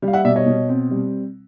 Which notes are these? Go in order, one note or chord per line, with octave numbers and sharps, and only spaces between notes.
G3
F5
E5 F#5
B2 D5 E5
C#5 D#5
B2
C4
G3